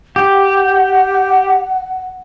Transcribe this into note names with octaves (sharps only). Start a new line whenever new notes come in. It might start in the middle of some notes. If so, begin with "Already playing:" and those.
G4 F#5